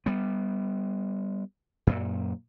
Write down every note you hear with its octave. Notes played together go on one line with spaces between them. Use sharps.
G3 B3
F#2 A#2